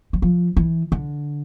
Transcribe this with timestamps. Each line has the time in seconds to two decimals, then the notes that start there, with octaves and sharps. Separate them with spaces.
0.13 F#3
0.22 F3
0.57 E3
0.92 D3